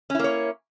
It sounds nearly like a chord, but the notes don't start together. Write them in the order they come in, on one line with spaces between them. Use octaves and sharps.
C#4 E4 A#3 C#5